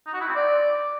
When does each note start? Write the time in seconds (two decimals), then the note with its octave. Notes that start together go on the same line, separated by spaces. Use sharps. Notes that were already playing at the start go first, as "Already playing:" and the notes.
0.06 D#4
0.14 F#4
0.21 E4
0.28 C4
0.35 D5